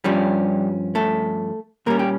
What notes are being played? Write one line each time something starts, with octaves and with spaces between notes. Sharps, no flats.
G2 F3 G3 C#4 G4
A3 A4
A#2 G3 A#3 C#4 A#4
G4